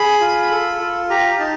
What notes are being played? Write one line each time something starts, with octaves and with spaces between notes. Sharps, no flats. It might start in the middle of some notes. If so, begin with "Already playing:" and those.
Already playing: G#4 B5
F4
A4
F4
G4 A#5
D#4 A5